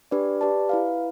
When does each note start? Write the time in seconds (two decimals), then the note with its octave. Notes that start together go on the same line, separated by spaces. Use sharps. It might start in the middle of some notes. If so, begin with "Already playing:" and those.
0.11 D4 G4 B4 D5
0.41 G4 B4 D5 A5
0.69 E4 B4 F5